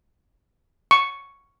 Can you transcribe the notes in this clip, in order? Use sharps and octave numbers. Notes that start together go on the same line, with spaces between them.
C#6